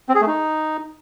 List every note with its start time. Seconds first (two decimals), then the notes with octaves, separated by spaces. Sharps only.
0.09 C4
0.15 G#4
0.21 A3
0.27 D#4